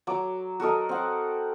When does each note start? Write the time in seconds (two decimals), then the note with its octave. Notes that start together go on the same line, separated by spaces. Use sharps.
0.07 F#3 D6
0.60 F#4 A4 A#4 D#5
0.89 C4 F#5